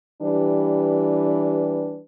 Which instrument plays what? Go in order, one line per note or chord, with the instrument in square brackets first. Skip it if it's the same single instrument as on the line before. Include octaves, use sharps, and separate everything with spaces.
[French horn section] E3 G3 D4 G4 B4